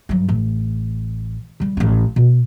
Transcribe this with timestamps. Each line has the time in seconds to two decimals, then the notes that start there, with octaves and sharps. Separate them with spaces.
0.09 G2 F#3
0.29 A1
1.60 C#3 G3
1.77 A1 C#4
2.16 B2